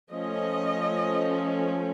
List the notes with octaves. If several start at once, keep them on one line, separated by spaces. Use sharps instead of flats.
F3 A3 C#4 D#5